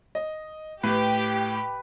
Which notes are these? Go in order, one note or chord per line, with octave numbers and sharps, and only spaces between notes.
D#5
A2 G4 B4